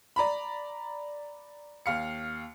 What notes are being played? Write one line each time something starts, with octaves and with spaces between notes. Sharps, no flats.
D5 A#5 B5
D#2 F5 C#7